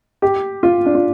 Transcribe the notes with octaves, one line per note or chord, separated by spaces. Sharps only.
G4
F4
D4
F4